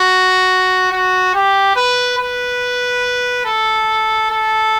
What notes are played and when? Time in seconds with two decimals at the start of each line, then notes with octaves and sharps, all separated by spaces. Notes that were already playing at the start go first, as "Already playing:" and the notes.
Already playing: F#4
0.92 F#4
1.34 G4
1.76 B4
2.18 B4
3.45 A4
4.31 A4